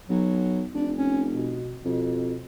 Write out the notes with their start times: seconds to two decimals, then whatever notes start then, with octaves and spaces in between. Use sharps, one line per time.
0.09 B1 F#3
0.74 F1 D4
0.98 C#4
1.34 B2
1.85 F2 B2